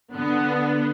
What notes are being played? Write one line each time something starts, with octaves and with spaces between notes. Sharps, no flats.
D3 B3